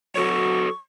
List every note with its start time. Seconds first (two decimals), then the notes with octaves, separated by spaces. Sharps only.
0.16 F#3 F#4 A4 C#5 C#6